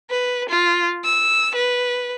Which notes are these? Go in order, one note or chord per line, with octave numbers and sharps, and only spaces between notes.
B4
F4
E6
B4